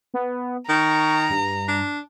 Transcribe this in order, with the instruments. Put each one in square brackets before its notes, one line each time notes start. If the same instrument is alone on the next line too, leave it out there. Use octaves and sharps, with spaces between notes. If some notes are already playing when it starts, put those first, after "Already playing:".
[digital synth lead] B3
[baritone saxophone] D#3 [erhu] A#5 [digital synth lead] C#6
[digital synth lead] G2
[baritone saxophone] D4